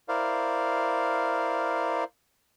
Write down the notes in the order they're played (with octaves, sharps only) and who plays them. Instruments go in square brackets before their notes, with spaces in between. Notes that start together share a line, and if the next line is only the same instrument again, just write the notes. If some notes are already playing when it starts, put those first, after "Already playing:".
[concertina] E4 A#4 C5 D5 F5